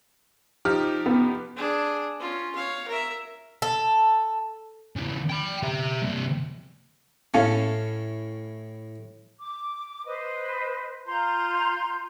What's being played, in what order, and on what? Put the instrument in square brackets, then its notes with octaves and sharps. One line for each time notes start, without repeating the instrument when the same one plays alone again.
[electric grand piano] F3 D#4 G4 [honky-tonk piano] F6
[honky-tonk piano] B3
[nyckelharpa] D4 G#4
C#4 F4
C#5 F5
A#4 E5
[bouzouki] A4
[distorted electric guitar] C#3 E3
G5 B5
G4 E5
G2 C3
[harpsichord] A2 [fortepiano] C#4 A4 F5
[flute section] D6
B4 C5 D#5
F4 A#5 C6 G6